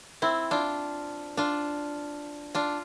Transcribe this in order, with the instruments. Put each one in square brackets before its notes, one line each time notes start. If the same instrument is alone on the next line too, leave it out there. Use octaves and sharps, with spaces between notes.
[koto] C4 E4
D4 F4
D4 F4
D4 F4